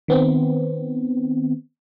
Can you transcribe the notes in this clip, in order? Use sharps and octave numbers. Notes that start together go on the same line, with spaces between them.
D#3 B3 C4